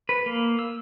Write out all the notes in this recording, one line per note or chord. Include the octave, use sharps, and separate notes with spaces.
B4
A#3
E6